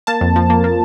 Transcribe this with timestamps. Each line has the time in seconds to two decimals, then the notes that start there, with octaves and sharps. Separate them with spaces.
0.07 A#3 A5
0.21 F2
0.36 F3
0.50 A#3
0.64 A#3